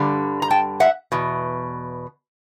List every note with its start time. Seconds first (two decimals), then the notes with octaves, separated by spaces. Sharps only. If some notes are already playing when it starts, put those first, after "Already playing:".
Already playing: G2 D3 G3
0.42 A#5
0.51 G5 A5
0.80 E5 F#5
1.12 E2 B2